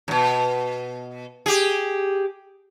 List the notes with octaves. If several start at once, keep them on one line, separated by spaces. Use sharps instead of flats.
F2 B2
G4 G#4